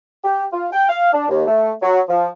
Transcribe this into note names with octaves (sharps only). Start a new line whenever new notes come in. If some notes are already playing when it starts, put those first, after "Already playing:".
G4
F4
G5
F5
D4
D#2
A3
F#3
F3